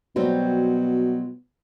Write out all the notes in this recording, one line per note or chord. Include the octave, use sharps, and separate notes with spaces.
B2 F#3 G3 C4